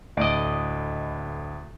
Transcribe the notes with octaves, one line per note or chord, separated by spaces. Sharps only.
D2 A2 D5 D#5